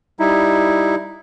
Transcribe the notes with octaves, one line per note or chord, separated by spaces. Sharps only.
G3 D#4 E4